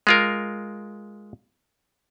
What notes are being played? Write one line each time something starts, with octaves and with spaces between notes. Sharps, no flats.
G#3 F4 A#4